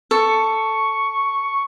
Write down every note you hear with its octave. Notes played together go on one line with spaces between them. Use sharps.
A4 C#6